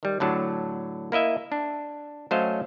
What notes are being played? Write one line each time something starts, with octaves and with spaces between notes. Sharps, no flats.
D#3 G3
A2 D3 F#3 A5
A#3 E4 D#5 E5
D4
F#3 A3 C#4 C5 D#5 F5